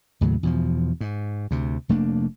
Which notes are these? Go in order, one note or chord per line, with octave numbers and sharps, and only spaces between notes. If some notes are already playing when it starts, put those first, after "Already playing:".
D#2 A2 C#3 F#3
E2 B2 F3
G#2
D2 C3
F1 A3 A#3 D4